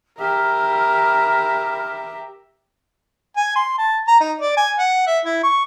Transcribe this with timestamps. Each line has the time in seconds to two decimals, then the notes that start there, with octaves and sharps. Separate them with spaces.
0.19 G4 A#4 E5 B5 F6
3.36 G#5
3.56 C6
3.78 A5
4.08 A#5
4.20 D#4
4.40 D5
4.57 G#5
4.79 F#5
5.07 E5
5.25 E4
5.43 C#6